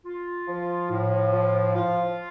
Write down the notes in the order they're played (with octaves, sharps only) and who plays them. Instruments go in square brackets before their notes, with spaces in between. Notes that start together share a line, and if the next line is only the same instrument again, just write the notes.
[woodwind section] F4
F3
A2
F3
F4